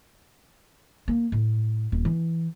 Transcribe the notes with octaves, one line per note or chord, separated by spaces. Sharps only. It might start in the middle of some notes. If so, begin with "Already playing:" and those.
A#3
A2
D#1
E3